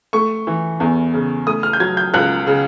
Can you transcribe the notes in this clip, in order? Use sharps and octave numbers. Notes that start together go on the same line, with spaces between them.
A3 C#6
E3
E2
C#3
A3 D#6
F6
G6
F#3 G#6
G6
C#2 F#6
C#3